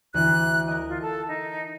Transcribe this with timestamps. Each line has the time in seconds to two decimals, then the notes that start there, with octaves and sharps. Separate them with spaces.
0.14 D2 E3 D4 F#6
0.68 A#4 D#5
0.88 F4
1.02 A4
1.28 D#4